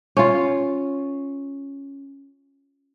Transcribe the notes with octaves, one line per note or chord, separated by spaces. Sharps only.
C#4 F4